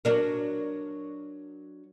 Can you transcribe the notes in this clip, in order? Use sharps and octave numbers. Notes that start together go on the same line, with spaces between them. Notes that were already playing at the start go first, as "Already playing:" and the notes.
F#3 D4 A#4